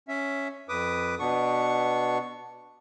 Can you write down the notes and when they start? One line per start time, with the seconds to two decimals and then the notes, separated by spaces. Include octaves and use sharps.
0.08 C#4 E5
0.69 F2 B4 D6 D#6
1.19 B2 B3 D4 C#6